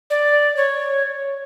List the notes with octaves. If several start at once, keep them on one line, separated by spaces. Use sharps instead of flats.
D5
C#5